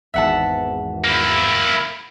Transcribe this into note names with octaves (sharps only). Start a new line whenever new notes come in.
G#1 E2 E5 F#5 A5
A#3 E4